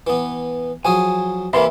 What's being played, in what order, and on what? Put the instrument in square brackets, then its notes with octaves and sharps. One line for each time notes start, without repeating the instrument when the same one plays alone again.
[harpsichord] E3 B3
[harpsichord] F3 F#3 G#4 [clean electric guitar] G#5
[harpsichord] C3 E3 A#3 [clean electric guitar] E5 B5 C6